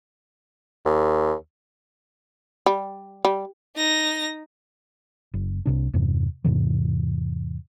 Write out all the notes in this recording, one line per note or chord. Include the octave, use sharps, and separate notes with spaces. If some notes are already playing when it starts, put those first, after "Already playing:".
D#2
G3
G3
D#4 A#6
F#1
C2 C3 D4
E2 G2 C3
E2 G#2 C3 E3